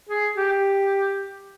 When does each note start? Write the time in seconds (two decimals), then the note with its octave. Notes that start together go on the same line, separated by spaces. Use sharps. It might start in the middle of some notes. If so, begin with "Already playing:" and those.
0.09 G#4
0.36 G4